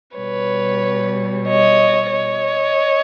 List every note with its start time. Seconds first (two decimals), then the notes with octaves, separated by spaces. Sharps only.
0.17 B2 G3 B4 C#5
1.47 C#5 D#5
2.12 C#5 D#5